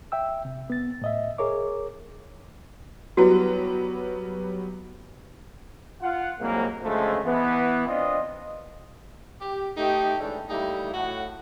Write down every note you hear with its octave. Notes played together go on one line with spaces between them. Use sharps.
E5 G5 E6
C3
B3 A6
A2 D#5 E5
G#4 A#4 C#5 D6
F#3 G3 B3 E4 F#4
F4 F#5
C2 F2 G#2 F#3 A#3
D2 C#3 F3 G#3 A3
E3 B3
C4 D4 F4 D#5
G4
A3 D#4 G4
E3 G#3 A3 C#4 D4
G3 A3 A#3 D#4 E4 G4
A2 F#4 F#5